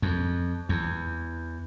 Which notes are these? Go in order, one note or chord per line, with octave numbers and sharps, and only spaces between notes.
F2
E2